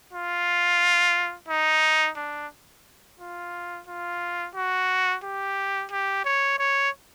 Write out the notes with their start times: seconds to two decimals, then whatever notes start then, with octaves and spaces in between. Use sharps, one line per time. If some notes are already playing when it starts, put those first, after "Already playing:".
0.13 F4
1.48 D#4
2.16 D4
3.19 F4
3.87 F4
4.55 F#4
5.24 G4
5.91 G4
6.25 C#5
6.59 C#5